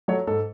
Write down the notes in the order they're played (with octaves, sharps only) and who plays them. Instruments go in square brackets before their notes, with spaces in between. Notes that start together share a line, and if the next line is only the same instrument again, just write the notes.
[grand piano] F#3 A3 C#5
G#2 A4